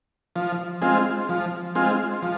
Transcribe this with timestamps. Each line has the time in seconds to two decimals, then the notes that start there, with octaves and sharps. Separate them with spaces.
0.36 F3
0.82 G#3 C4 F4
1.29 F3
1.75 G#3 C4 F4
2.22 F3